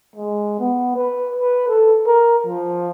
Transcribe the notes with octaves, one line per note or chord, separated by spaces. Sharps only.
G#3
B3
B4
B4
A4
A#4
F3